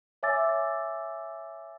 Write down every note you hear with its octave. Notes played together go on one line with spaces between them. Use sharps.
C#5 E5 G#5 D6 E6 A6